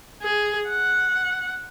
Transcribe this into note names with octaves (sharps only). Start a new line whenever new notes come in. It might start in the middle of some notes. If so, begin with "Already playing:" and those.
G#4
F#5